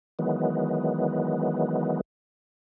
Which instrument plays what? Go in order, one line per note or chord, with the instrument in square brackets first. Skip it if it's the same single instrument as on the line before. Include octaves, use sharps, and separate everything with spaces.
[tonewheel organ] D#3 E3 F#3 G#3 B3